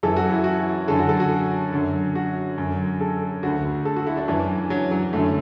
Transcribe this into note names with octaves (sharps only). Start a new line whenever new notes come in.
F#2 E3 A4
F#4
E4
F#4
F#2 D3 A4
F#4
A4
F#4
F#2 D3
F#4
F#2 D3
A4
D2 D3 F#4
A4
F#4
E4
D4
F#2 E3 D4
F#3
F#3
F#2 D3 A3